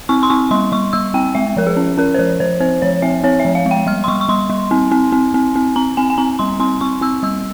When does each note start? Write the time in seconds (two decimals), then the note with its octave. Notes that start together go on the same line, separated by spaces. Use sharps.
0.09 C4 C#6
0.23 C6
0.30 C4 C#6
0.51 G3 C6
0.72 G3 C#6
0.93 G3 E6
1.14 C4 G5
1.35 G#3 E5
1.57 F3 A#4
1.67 G#4
1.77 C#4
1.98 C#4 A#4
2.14 C5
2.19 F3 A#4
2.40 F3 C5
2.60 C4 C5
2.82 F3 C#5
3.02 C4 E5
3.24 C4 C#5
3.40 E5
3.45 F3
3.55 F5
3.66 G#3 G5
3.86 G3 F6
4.04 C6
4.08 G3 C#6
4.21 C#6
4.29 G3 C6
4.50 G3
4.71 C4
4.92 C4
5.12 C4
5.34 C4
5.56 C4
5.76 C4 A#5
5.97 C4 G#5
6.10 G#5
6.18 C4 A#5
6.39 G3 C6
6.60 C4 C6
6.81 C4 C#6
7.01 C4 E6
7.23 G3 E6